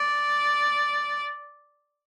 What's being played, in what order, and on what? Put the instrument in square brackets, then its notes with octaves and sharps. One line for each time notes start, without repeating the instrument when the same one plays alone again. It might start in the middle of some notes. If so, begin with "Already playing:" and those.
Already playing: [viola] D5